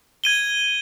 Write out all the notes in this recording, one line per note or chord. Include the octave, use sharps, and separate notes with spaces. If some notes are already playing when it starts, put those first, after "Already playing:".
G#6 D#7 G7